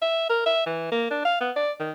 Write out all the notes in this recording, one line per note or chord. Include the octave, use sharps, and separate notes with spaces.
E5
A#4
E5
E3
A#3
D4
F5
B3
D5
D#3